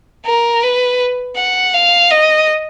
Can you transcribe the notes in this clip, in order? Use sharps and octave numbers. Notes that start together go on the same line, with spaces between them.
A#4
B4
F#5
F5
D#5